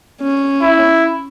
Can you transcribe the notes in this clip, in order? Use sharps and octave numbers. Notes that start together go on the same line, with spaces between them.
C#4
E4